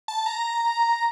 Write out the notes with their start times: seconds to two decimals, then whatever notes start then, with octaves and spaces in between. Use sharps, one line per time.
0.08 A5
0.26 A#5